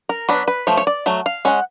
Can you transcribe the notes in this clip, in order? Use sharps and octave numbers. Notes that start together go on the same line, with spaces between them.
A#4
F#3 B3 D4 B4
B4
F3 A3 C#5
C#5
D5
F#3 A3
F5
G#3 C#4 F#5